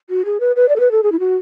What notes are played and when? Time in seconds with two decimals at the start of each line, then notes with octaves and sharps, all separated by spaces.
0.10 F#4
0.25 G#4
0.40 B4
0.56 B4
0.69 D5
0.76 A4
0.80 B4
0.91 A4
1.03 G#4
1.12 E4
1.20 F#4